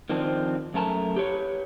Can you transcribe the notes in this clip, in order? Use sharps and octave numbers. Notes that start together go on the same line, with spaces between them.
D#3 F3 C4 D4
F#2 A3 A#4 A5
G4 B4 C#5